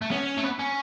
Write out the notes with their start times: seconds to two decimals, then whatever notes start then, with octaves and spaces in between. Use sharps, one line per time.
0.02 A3
0.11 B3 C#4
0.38 A3
0.44 B3
0.59 C#4